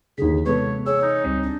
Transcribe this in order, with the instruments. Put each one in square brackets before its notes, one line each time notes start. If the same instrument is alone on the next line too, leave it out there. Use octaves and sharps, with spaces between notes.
[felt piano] D#2 D3 [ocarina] G#4 [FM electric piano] B6
[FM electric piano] C3 E3 G#3 [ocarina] B3 [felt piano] A4 B4 [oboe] C#5
[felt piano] G#4 [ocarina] C#5 [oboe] E6
[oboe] D#4
[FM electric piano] C#2 G3 C4
[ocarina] D4